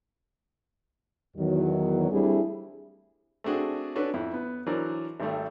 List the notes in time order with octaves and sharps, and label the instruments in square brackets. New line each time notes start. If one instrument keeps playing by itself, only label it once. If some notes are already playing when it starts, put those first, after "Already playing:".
[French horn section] E2 D#3 F#3
G3 A3 C4 D4 E4 G#4
[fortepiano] A3 C4 D4 F#4 G#4
C#4 D4 F#4 A4 B4 C#5
F2 E4
B3
E3 F#3 D4 A#4 C5 D5
G#1 G3 A3